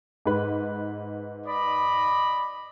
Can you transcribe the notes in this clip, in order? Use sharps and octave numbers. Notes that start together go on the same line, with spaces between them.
G#2 B4
D5 D#5 B5